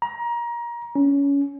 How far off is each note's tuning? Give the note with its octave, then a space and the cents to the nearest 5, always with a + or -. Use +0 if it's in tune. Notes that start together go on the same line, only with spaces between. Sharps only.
A#5 +25
C#4 +20